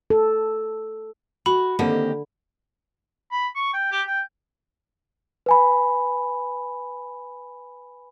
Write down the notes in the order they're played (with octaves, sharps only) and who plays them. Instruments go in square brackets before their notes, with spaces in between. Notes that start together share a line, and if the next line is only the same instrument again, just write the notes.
[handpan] A4
[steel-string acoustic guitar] F#4 [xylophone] B5
[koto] D3 [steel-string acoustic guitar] D#3 G4 D#5 [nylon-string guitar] A#3 C4
[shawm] B5
C#6
G5
G4
G5
[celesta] B4 G#5 B5